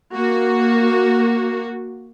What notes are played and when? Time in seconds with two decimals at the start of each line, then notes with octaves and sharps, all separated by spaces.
0.12 A#3 F#4